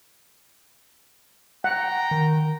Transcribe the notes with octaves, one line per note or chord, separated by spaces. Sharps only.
F#5 G5 A#5
D#3